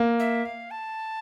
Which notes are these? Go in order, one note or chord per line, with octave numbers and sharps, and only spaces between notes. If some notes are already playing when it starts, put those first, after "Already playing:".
Already playing: A#3
E5
F5
A5